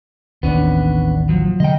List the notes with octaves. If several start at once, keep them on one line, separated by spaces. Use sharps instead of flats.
A1 D#2 B3 C#4 D4
F3 F#3
D3 G3 G#3 D#5 G5